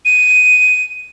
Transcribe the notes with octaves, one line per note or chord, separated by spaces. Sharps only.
D#7